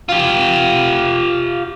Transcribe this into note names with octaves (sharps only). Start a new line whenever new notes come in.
F4 G4